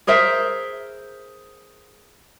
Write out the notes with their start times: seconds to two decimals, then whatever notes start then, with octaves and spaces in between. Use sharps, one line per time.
0.07 G#4 A#4 C5 E5